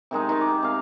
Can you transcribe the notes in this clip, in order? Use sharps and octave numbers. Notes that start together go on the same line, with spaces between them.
C3 D#3 G#3 D#4
D#3 D#4
D6
C3 F5